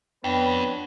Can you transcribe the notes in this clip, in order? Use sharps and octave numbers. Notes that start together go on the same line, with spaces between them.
F2 B3 D4 B4 C#5 G5